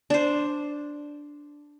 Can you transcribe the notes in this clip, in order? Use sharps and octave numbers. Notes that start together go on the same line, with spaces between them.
D4 C5